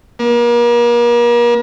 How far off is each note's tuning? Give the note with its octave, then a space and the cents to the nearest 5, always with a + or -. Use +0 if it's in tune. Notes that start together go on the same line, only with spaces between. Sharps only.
A#3 +40